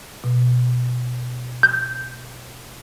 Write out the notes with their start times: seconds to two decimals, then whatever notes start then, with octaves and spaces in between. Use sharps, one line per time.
0.24 B2
1.63 G6